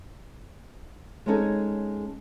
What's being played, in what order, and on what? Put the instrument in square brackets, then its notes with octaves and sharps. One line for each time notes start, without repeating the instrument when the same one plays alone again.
[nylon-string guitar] G#3 C4 C#4 D#4 G#4 A4